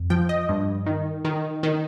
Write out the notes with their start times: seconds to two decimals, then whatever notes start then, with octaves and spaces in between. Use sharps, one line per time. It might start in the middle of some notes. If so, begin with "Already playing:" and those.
Already playing: F2
0.10 F3 G5
0.29 D#5
0.49 G2
0.86 D#3
1.25 D#3
1.63 D#3